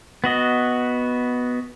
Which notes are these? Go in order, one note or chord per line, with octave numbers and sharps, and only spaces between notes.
B3 F#4 D#5